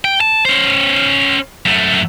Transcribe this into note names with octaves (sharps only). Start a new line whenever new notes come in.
G5
A5
C#4 C5
F#2 A3